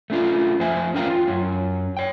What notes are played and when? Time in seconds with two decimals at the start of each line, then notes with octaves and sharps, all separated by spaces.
0.10 A3 C#4 F4
0.60 F2 C5 E5 G#5
0.94 C#4 F4 A#4 F5 G5 A#5
1.10 F4
1.28 F#2 C#4
1.97 C#5 G5